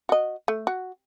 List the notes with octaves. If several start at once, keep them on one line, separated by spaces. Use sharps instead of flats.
F#4 D#5
A3
F#4